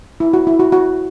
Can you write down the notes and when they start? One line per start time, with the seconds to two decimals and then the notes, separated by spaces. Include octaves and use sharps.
0.20 E4
0.33 F#4
0.47 E4
0.60 F#4
0.72 F#4